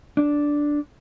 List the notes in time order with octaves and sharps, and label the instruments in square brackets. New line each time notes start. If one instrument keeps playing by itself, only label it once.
[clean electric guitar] D4